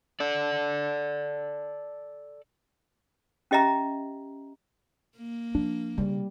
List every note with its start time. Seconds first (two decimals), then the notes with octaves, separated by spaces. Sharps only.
0.20 A4 D5
3.51 C#4 G4 D#5 E5 A#5
5.17 A#3
5.55 F3 D4
5.98 C#3 G3